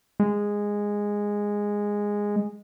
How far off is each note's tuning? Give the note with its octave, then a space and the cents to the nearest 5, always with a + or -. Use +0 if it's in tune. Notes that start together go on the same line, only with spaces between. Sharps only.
G#3 -10